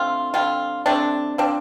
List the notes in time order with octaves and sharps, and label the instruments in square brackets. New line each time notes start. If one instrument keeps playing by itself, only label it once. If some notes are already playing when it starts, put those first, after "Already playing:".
Already playing: [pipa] D3 A3 C4 F4
D3 G3 C4 F4
C3 A3 C4 D4
F3 C4 D4